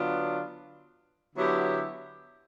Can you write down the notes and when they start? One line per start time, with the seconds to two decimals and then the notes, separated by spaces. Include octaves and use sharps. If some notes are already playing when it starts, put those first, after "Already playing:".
Already playing: D3 F#3 B3 D4 F4
1.35 D3 F#3 B3 E4 G4